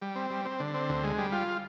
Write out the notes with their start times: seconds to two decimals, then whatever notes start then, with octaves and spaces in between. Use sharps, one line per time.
0.02 G3
0.16 C4
0.31 G3
0.45 C4
0.60 D3
0.74 C4
0.89 D2
1.04 G#3
1.18 G3
1.32 F4